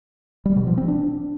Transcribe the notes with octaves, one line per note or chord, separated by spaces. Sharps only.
G3
B2
F3
C4
D4